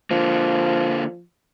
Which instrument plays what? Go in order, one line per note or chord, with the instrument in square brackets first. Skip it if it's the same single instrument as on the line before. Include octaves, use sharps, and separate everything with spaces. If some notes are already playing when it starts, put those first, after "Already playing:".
[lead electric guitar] D3 A#3 [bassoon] F3